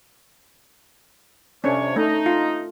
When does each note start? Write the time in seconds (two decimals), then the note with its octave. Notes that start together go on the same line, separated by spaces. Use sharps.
1.64 F2 C3 C#4 D4 C#5
1.96 A3 D#4
2.26 F4